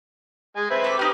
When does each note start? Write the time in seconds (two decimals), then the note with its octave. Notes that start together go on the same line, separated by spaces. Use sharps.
0.57 G#3 G#5
0.70 C4 B4 E5
0.84 A4 D6
0.99 D#4 G4 B4 F6